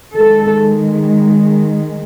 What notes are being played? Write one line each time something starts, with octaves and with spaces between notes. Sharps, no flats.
D#3 G#3 A4